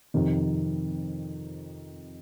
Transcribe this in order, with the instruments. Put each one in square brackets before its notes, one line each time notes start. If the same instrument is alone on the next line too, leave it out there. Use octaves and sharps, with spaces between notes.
[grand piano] F2 C3 D#3